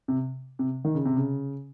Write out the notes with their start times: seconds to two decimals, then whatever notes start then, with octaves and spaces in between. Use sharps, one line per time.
0.08 C3
0.59 C3
0.85 D#3
0.95 C#3
1.05 C3
1.16 C#3